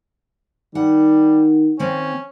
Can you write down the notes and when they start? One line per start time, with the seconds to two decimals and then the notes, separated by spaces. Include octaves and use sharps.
0.75 D#3 G3 F#5
1.79 D#3 A#3 C4 C#4